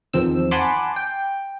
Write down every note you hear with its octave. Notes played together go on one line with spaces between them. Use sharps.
E2 D#3 F3 C4 E6
F#5 G#5 A5 B5 C6 D6
G5